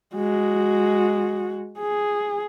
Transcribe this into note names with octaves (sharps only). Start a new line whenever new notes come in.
G#3 F#4
G#4